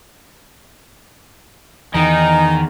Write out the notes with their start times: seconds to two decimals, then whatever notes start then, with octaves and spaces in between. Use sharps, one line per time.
1.94 E2 D#3 E3 D#4 G#5 A#5